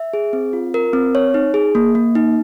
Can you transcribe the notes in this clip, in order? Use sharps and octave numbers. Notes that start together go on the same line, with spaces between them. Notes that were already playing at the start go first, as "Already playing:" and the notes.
Already playing: E5
G#4
C4
F4
A#4
C4
C#5
D#4
G#4
A#3
A#3
D#4